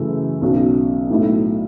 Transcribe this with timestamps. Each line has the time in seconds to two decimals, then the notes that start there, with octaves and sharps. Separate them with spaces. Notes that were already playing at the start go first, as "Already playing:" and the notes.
Already playing: F#2 C#3 E3 A3
0.42 B1 B2 F#3 C#4 F#4
1.09 B1 A2 F#3 A3 E4